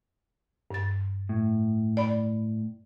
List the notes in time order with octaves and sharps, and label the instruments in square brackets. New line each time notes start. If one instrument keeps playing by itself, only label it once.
[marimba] G2 A6
[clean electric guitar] A2
[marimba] D5 B5